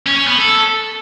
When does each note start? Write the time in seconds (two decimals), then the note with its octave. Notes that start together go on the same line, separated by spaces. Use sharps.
0.07 C#4
0.17 C#4
0.28 B3
0.38 A4